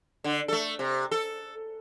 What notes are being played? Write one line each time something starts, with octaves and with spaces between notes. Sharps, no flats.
D3
A3 A4
C3
A4